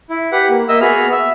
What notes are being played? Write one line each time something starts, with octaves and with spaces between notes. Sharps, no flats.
E4
G4 B4 F#5
A#3
A#3 D#5 E5 E6
B3 F#4 G#4 B5 F6
E5